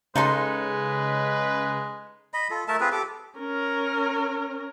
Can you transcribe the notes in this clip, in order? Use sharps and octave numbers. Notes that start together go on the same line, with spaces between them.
C#3 G#3 D#4 A4 B4 C6
D#5 B5
F4 A4
A3 A#4 E5 A5
C4 F4 G#4 B4
G4 A4 D6
C#4 A#4